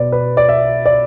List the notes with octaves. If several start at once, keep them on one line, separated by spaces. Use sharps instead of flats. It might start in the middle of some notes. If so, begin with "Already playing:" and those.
Already playing: B2 B3 B4 D5
B4
D5
E5
D5